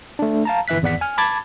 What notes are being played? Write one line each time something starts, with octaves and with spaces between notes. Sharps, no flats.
A3 D4
F5 A5 A#5
G1 E3 E5 F#6 B6
G#1 E2 D5 F#5 B6
G#5 F6
A5 B5 D6 G#6 A6